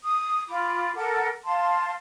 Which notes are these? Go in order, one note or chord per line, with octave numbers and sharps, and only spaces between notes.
D#6
F4 B5 D6
A4 A#4 F#5 D6
F5 A5 C6